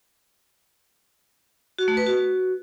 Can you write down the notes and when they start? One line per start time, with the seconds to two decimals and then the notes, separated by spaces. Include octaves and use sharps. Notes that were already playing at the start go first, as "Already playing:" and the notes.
1.79 F#4
1.88 A3
1.97 B4
2.06 F#4